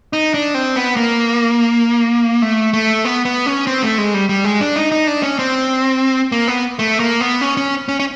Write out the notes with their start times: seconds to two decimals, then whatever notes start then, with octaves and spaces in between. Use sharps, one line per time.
0.13 D#4
0.34 D4
0.55 C4
0.76 B3
0.96 A#3
2.42 A3
2.73 A3
3.05 B3
3.25 B3
3.46 C#4
3.67 C4
3.82 A3
3.98 G#3
4.14 G3
4.29 G3
4.45 G#3
4.61 D4
4.76 D#4
4.92 D#4
5.07 D4
5.23 C#4
5.39 C4
6.32 A#3
6.48 B3
6.79 A3
7.00 A#3
7.21 B3
7.41 C#4
7.57 C#4
7.88 C#4
8.00 C#4